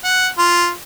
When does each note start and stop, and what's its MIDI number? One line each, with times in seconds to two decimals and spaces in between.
0.04 0.28 78
0.38 0.70 65